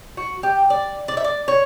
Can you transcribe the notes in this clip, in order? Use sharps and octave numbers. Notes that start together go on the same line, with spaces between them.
F#4
G4
D5
D5
E5
D5
C#5